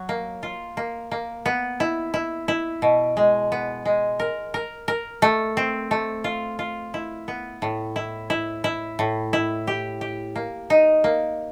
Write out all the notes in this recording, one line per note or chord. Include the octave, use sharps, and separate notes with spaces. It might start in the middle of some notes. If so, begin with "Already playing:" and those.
Already playing: F#3
A#3
F4
A#3
A#3
B3
E4
E4
E4
B2
G#3
B3
G#3
A#4
A#4
A#4
A3
C4
A3
F4
F4
E4
B3
A2
E4
E4
E4
A2
E4
G4
G4
A#3
D#4
A#3